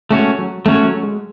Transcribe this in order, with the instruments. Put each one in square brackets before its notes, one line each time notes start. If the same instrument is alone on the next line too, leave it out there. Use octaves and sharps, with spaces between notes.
[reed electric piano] G#3 [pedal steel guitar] A3 C#4 F#4 C#5
[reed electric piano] F#3
[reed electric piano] G#3 [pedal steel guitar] A3 C#4 F#4 C#5
[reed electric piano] F#3
G#3